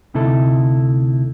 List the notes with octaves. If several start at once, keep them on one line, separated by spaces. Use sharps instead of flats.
D2 C3 D#4 E4 A4